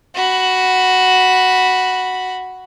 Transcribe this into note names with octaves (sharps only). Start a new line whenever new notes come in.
F#4 B5